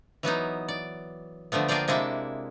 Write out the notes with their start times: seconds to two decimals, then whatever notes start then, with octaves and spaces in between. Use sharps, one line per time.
0.23 E3 F#3 B3 D#4
0.68 D5
1.52 D3 F3 A3 B3
1.68 A#3 F4 G#4 D5 G5
1.88 C3 G#3 A#3 D4 E4